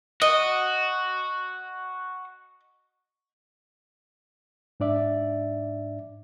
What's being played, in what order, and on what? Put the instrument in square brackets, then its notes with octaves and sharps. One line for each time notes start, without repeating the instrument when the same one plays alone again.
[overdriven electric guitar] F#4 [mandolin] D#5
[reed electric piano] G#2 D4 D5 E5